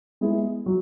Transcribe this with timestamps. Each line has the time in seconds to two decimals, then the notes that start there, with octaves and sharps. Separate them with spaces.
0.21 G#3 B3 E4 G#4
0.66 F#3